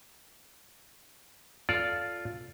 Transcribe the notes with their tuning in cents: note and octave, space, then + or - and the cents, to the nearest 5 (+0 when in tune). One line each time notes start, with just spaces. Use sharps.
F4 +0 A4 +0 D5 -15